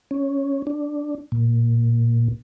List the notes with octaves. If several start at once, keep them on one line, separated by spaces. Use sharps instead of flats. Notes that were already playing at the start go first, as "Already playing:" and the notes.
C#4
D4
A#2